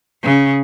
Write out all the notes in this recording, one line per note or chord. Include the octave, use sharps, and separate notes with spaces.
C#3